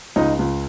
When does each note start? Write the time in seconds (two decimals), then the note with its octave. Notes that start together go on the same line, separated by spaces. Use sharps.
0.16 C#2 D#4
0.39 C#2